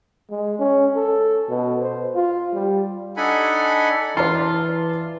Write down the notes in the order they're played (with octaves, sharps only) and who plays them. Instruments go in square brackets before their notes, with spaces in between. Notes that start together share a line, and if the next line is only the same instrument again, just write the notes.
[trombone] G#3
C#4
A4
B2
C5
F4
G3
[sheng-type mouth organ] D4 D#4 A4 F#5 G#5 B5
[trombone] E3 [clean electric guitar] F4 [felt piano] D5 A5 C6